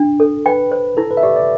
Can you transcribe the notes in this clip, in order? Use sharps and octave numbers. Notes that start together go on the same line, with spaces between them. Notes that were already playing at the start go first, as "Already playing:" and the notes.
Already playing: D4
A4
B4 G5
C5
E4 A4
B4
E5
G4 D5
D5